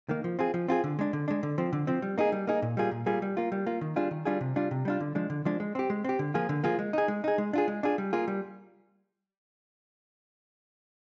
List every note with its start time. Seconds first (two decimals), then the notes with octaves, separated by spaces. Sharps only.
0.09 D#3 A#3
0.24 F3
0.39 C4 F4 G#4
0.54 F3
0.68 C4 F4 G#4
0.84 D3
0.99 G#3 D4
1.13 D3
1.28 G#3 D4
1.43 D3
1.58 F3 C4
1.73 D3
1.87 F3 C4
2.02 G3
2.18 A#3 D#4 G#4
2.32 G3
2.47 A#3 D#4 G#4
2.62 A#2
2.77 G3 A#3 F4 G#4
2.91 A#2
3.06 G3 A#3 F4 G#4
3.22 G3
3.37 A#3 F4
3.52 G3
3.66 A#3 F4
3.81 D#3
3.96 G3 D4 F4 G#4
4.11 D#3
4.25 G3 D4 F4 G#4
4.41 C3
4.56 G3 D4 F4
4.71 C3
4.85 G3 D4 F4
5.00 D3
5.15 F3 G#3 D4
5.30 D3
5.45 F3 G#3 D4
5.60 G#3
5.75 C4 G4
5.90 G#3
6.04 C4 G4
6.19 D3
6.34 F3 A#3 F4 G#4
6.49 D3
6.64 F3 A#3 F4 G#4
6.79 G#3
6.93 D#4 G#4
7.08 G#3
7.24 D#4 G#4
7.38 G#3
7.53 D4 F4 G#4
7.68 G#3
7.83 D4 F4 G#4
7.98 G3
8.13 A#3 F4 G#4
8.28 G3